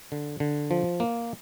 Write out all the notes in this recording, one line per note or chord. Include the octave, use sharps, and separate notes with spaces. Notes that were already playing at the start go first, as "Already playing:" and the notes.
D3
D3
F3
A#3